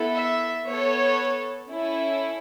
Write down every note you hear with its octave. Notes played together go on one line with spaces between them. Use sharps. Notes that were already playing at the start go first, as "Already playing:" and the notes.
Already playing: B3 E4 A4
E5
B3 A4 C#5
C#4 E4 A4